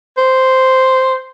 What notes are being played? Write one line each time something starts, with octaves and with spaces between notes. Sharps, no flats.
C5